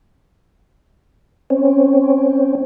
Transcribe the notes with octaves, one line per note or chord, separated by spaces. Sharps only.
C4 C#4